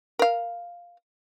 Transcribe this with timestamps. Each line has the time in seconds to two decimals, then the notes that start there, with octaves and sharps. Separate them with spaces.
0.19 A#4 F5